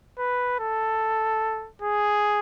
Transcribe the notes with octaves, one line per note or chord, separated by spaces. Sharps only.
B4
A4
G#4